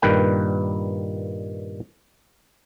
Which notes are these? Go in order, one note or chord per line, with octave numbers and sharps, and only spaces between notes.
G2 A#2 D#3 B4 G5